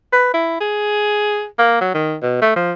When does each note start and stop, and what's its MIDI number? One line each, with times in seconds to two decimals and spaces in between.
0.12 0.33 71
0.34 0.57 64
0.60 1.45 68
1.58 1.80 58
1.81 1.93 54
1.94 2.15 51
2.22 2.38 47
2.42 2.53 57
2.56 2.72 53